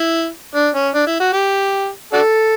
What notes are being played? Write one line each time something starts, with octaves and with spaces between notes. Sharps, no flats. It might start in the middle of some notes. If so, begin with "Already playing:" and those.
Already playing: E4
D4
C#4
D4
E4
F#4
G4
D4 F#4 A4